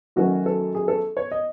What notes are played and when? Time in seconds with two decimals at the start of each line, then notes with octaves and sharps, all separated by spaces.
0.16 F#2 D#3 F#3 A3 C#4 F#4
0.46 A4
0.75 G#4
0.88 A4
1.17 C#5
1.31 D#5